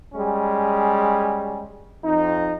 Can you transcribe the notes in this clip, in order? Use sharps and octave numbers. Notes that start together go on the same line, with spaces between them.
G3 G#3 C#4 G#4
F2 D#4